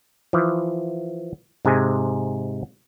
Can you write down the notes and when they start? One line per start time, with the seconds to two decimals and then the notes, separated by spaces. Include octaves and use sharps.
0.33 E3 F3
1.65 G#2 C3 G#3 G#5